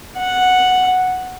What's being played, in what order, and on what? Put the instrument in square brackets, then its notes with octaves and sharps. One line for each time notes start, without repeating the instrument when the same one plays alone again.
[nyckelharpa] F#5